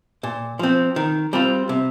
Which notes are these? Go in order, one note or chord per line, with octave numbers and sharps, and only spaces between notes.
A#2
F3 C4
D#3
G3 C4 F4
C3